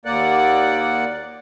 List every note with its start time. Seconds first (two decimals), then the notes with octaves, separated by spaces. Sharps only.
0.05 D#2 A#3 D5 F#5